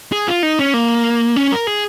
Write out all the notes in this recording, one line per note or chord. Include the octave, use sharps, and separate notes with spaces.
G#4
F4
D#4
C#4
A#3
C#4
A#4
G#4